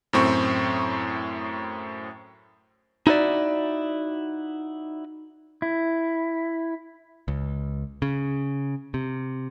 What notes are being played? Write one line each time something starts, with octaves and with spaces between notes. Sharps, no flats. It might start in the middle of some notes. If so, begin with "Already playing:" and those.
F#2 A2 C4 C#6
D#4 E4 F#4 A#4 D5 E5
E4
C#2
C#3
C3